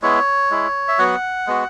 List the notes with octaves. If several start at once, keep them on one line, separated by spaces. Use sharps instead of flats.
G#3 B3 E4 C#5
G#3 E4
E5
F#3 B3 F#4 F#5
G#3 B3 F#4